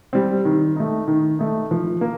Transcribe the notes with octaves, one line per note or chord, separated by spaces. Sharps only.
G3 C4
D#3
A3 D#4
D#3
A3 D#4
F3
A#3